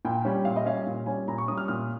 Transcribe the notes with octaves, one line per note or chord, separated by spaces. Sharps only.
A#2 G5
G3 C#4
A#2 F5
D#5
G3 C#4 F5
A#2
G3 C#4 G#5
A#2 A#5
C#6
G3 C#4 D#6
F6
A#2 F6